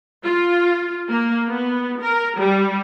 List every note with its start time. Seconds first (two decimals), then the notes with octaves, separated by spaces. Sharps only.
0.24 F4
1.09 A#3
1.48 B3
2.01 A#4
2.39 G3